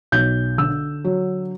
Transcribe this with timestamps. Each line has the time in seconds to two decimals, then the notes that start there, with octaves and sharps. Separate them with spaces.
0.12 B1 G6
0.58 D3 E6
1.04 F#3